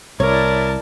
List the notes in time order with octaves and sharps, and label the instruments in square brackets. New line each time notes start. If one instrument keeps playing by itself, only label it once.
[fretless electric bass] C2 [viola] E4 D5 [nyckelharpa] A#4 A5 [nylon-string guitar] C#5